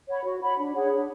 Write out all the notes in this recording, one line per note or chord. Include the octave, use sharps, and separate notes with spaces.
C#5 F#5 B5
F#4
C#5 F#5 B5
D4
G#4 C#5 F#5
D4